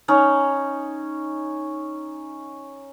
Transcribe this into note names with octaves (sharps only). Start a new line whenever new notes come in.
C#4 D#4